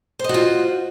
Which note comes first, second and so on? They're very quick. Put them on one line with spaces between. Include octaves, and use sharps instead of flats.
C5 D#5 F#4 F4